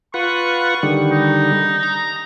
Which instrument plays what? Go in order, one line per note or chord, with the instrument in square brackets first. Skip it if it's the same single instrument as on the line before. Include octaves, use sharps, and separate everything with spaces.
[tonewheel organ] F4 B4 F#5 [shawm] C#6
[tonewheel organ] D3 D#3 G3
[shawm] D#4
[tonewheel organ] A#5